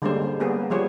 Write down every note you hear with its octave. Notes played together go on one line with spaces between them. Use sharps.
D3 G3 G#3 A#3 C#4 C5
D3
G3 A#3 B3 C#4 G#4
F3 G3 G#4 C5 C#5